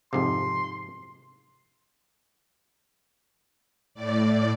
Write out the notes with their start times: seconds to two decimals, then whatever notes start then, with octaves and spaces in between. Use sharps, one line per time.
0.13 F2 G#2 C3 C6
3.95 A2 D5